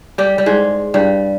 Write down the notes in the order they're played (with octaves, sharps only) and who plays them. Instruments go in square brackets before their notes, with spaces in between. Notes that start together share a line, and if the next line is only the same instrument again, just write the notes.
[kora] G3 G4
G3
G#2 G#3
G2 G3